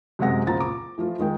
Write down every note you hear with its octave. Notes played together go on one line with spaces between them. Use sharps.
F#2 C3 G#3 F#5 A#6
C#2 A#2 F3 C5 A#5 A6
D6
E3 F3 A3 F4
D#3 G#3 G5